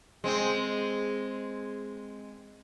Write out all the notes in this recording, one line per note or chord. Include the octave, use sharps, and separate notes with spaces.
G#3 C4